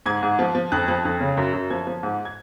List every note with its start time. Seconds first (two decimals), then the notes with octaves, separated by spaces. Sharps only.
0.06 G#2 G#6
0.23 G#2
0.39 F3
0.55 F3
0.72 F2 F#6
0.88 F3 F#6
1.05 F2
1.20 C#3
1.37 F#2
1.53 F#2
1.70 F3 G#6
1.87 F3
2.03 G#2
2.25 G#6